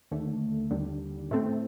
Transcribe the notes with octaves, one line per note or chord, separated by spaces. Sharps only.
D#2 D3 A3
D#2 D3 G3
A2 A3 C4